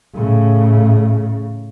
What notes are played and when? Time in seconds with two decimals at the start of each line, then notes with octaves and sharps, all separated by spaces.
0.14 A2 C#3